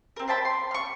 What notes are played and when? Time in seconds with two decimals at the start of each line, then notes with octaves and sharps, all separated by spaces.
0.16 C4 A#4
0.28 C5 G5 A5 B5
0.45 C6
0.71 C#6 F6